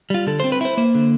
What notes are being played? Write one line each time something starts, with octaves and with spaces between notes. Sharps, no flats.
G3 F4
D3 A4
C4 C5
B4
E4 C5
A#3 C5
D3